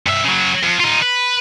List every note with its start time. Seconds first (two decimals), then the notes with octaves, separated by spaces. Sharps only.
0.07 G2 E5
0.24 C#3 F#3
0.64 F2
0.80 D#4 F4
1.02 B4